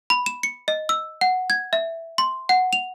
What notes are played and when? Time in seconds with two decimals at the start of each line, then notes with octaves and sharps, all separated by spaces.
0.10 B5
0.26 E7
0.43 C#7
0.68 D#5
0.89 E6
1.21 F#5
1.50 G#6
1.73 E5
2.18 C6
2.49 F#5
2.73 F7